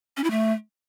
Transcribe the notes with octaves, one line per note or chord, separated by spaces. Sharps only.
C#4
E4
A3